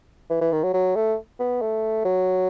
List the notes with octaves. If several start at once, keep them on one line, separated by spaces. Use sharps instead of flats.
E3
E3
D#3
F#3
F#3
A3
B3
A3
F#3